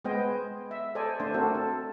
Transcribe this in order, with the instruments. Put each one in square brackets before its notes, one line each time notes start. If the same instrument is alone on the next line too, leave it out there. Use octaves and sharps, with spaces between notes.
[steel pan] G#3 B3 C5 D#5 G5 G#5
E5
A4 C5 D5 D#5 G#5
A3 D4 C5
C4 D4 F#4 A4 A#4
A4